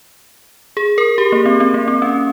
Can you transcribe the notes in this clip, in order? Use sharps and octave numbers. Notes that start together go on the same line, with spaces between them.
G#4
A#4
G4
A#3
C4
C4
A#3
C4
C#4